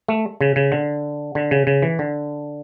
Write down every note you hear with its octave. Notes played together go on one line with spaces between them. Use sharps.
A3
C#3
C#3
D3
D3
C#3
C#3
E3
D3